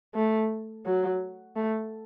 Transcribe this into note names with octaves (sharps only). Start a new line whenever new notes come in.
A3
F#3
A3